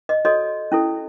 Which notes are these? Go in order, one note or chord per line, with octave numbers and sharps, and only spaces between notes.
D#5
F#4 A4 C#5 D#5
C#4 E4 A4